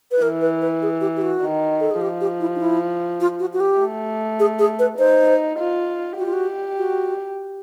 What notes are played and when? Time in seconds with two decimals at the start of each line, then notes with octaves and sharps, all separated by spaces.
0.11 B4
0.22 E3 A#4
0.41 B4
0.61 B4
0.82 G#4
1.01 G4
1.17 G4
1.21 F#4
1.41 D#3
1.80 A4
1.91 G#4
2.01 F3 G4
2.21 G4
2.40 E4
2.56 D#4
2.60 E4
3.20 F4
3.40 F#4
3.53 F#4
3.60 G4
3.80 A3
4.39 G#4
4.59 G#4
4.79 B4
4.99 D#4 C5
5.59 F4
6.18 F#4 G4
6.26 F4
6.33 F#4
6.77 F#4